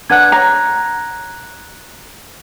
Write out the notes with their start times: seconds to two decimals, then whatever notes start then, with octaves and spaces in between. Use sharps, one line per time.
0.10 D4 B4 F#5 F#6 G#6
0.32 C#5 A#5